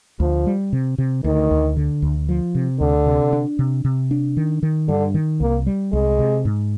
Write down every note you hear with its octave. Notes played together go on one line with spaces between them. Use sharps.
D2 F3
G3
C3
C3
D2 D#3
D2
D3
D2
F3
C3
D2 D3
C3
D4
C3
C3
D4
D#3
D#3
G2 D3
D#3
C2 A#3
G3
C2 G#3
C3
G#2